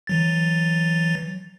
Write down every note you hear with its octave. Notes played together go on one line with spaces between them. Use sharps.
E3 F#3 A6